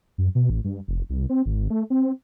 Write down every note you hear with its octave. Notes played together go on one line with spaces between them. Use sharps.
F#2
B2
A1
G2
F1
C2
C4
G#1
A3
C4